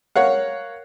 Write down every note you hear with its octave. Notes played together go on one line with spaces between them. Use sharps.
A#4 C#5 F5 F#5